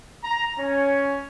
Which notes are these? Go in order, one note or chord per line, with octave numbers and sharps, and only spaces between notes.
A#5
C#4